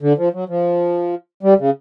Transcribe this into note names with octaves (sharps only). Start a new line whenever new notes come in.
D3
F3
F#3
F3
G3
C#3